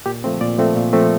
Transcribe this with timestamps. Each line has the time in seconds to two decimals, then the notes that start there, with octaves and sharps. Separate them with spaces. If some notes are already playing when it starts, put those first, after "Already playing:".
0.06 A#2 G4
0.24 F3 A3 C4
0.41 A#2 D5
0.58 F3 A3 C4
0.76 A#2
0.93 F3 A3 C4